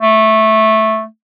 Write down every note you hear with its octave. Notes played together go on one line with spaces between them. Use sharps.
A3